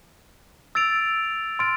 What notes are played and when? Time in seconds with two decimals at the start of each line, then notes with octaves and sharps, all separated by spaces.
0.75 E6 A6 D7 F7
1.59 C6 F6 A6 D7